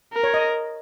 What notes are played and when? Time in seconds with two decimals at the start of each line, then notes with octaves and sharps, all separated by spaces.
0.13 A#4
0.24 C#5
0.34 D#5